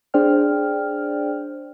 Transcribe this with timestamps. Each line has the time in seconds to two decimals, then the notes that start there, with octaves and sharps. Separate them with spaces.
0.14 D4 G#4 C5 D5 G5 F6